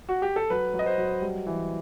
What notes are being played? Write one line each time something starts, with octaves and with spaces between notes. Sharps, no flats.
F#4
G4
A4
F#3 B4
F#3
D#5
C5
F#3
G3
E3